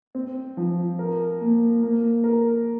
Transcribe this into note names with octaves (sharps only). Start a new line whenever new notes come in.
C4
F3
A#4
A#3
A#3
A#4